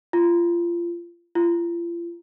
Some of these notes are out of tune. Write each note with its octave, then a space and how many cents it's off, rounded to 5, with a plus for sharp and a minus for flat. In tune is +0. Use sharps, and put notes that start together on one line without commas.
F4 -25
F4 -40